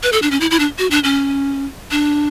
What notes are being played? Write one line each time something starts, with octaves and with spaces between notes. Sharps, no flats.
B4
A4
D4
C#4
E4
E4
D4
F#4
D4
C#4
D4